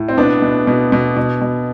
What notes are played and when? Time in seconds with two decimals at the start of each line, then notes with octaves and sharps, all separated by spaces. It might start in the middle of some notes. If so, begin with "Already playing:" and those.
Already playing: A2
0.08 C4
0.17 B2 B3 D4
0.42 B2
0.67 B2
0.92 B2
1.17 B2
1.42 B2